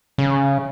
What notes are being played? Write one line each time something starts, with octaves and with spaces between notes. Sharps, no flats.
C#3